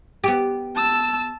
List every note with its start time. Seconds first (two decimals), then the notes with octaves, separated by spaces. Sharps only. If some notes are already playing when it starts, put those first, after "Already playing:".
0.24 B3 G4
0.75 A5 E6